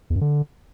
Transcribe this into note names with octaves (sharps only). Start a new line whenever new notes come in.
E2
F#2
D3